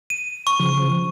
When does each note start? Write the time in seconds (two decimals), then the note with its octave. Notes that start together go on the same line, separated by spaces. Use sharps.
0.10 D#7
0.47 C#6
0.60 C#3 F3